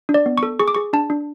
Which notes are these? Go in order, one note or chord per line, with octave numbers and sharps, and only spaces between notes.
D4
D5
B3
C#6
A4
G#4 C#6
D6
G#4 C#6
D4 A5
D4